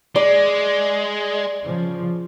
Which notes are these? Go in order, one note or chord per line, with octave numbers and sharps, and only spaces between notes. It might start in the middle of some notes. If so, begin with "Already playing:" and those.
G#3 D5
C#3 F3